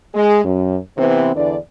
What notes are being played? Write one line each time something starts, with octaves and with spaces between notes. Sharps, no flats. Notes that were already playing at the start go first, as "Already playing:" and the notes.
G#3
F#2
C3 E3 B3 C4
E2 D3 E3 D4 D5